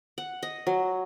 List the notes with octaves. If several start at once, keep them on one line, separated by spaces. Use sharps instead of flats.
F#5
D#5
F#3